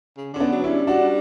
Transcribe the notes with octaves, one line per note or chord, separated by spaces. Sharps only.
C#3
D3 C#4
B3 D4
F#3
C#4 E4
G3
D4 F#4